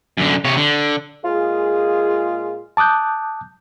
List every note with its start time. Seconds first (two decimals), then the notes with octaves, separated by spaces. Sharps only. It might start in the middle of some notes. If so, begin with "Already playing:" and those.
0.18 F#2 D3
0.45 C3 C#5
0.57 D3
1.25 A#2 G#3 F4 G#4
2.77 A5 D6 D#6 F#6 G6